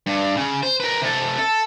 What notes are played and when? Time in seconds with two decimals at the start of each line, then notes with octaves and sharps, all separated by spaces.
0.07 G2
0.37 C#3
0.63 C5
0.80 A#4 B4
1.01 C3 A4
1.38 A4